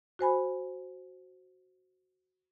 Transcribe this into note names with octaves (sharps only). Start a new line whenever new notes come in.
F#4 C5 G#5 B5